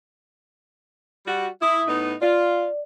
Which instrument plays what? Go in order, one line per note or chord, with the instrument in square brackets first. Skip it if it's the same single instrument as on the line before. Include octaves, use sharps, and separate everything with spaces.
[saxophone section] G3 F#4
[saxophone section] E4 [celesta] D#6
[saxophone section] A2 B3 D#4
[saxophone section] F4 [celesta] D5